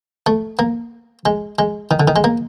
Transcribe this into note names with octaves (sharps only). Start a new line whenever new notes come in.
A3
A#3
G#3
G#3
D#3
D3
D#3
G#3
A#3